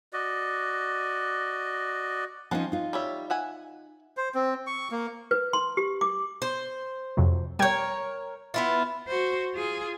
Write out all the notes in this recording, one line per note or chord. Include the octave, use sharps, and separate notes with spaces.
F#4 D5 D#5
F3 C4 C#4 D#4 F#5 A5
D#4 F4
G3 C#5 E5
E5 F#5 G#5
C5
C4
C#6
A#3
B4
C6
G4
D6
C5
F2 C3 F#3
G3 A#4 C#5 G5 G#6
B3 E4 F4
F#4 C5
F4 G#4